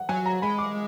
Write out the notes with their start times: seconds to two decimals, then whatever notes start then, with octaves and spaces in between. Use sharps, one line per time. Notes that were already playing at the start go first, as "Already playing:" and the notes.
Already playing: F#5
0.09 F#3 G#5
0.26 A#5
0.42 G#3 B5
0.58 D6